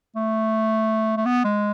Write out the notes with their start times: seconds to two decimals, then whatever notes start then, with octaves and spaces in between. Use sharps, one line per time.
0.16 A3
1.17 A3
1.25 B3
1.44 G#3